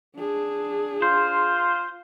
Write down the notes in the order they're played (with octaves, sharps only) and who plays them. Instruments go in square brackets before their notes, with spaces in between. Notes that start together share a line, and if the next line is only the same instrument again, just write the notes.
[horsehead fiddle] D4 G#4
[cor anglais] F4 [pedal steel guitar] C5